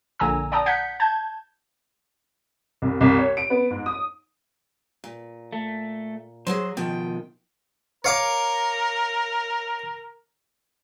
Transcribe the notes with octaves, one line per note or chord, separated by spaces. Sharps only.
A#1 D3 G#5 A#5 E6
D5 G5 A5 A#5 D#6
F#5 G6 G#6 B6 C#7
A5 G6 G#6
C2
C2
C#5
D7
B3
G#2
D#6
A#2
A3
F#3 F#4 G#4 C5
B2 D#3 F3 G5
A#4 C#5 F5 D6